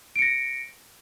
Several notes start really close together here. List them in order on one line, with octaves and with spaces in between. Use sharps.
D7 C#7 A#6